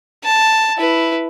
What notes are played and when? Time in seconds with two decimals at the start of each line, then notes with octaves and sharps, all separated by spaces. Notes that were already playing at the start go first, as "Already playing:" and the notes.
0.24 A5
0.78 E4 B4